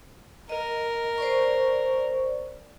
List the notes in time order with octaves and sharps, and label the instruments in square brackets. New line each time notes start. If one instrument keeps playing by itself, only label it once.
[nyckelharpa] A#4 [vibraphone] D#5
[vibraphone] C5 D5 C#6